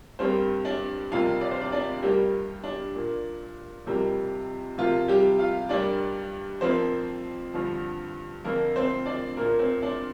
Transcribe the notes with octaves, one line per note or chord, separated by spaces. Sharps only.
G2 G3 A#3 C4 C5
D4 D5
F2 C3 G3 A#3 F4 F5
D5
C5
D4 D5
D4 D5
G2 G3 A#3 G4
D4
A#2 A#3
F2 C3 G3 A#3
C3 F3 A#3 F4
G3 G4
F4 F5
G2 G3 A#3 D4 D5
F2 F3 A#3 C4 C5
G2 D3 F3
F2 D3 F3 A#3 A#4
C4 C5
D4 D5
A#2 A#3 A#4
C4 C5
D4 D5